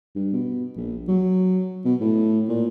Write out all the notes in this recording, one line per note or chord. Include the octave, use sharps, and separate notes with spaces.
G2
B2
A#1
F#3
B2
A2
A#2